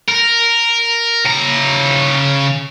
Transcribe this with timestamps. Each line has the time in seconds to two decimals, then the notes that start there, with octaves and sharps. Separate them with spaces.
0.09 A#4
1.25 C#3 A#5